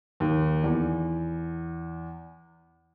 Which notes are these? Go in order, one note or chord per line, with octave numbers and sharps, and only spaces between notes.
D#2
E2